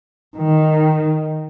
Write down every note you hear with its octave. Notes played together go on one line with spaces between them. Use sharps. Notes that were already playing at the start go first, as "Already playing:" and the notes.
D#3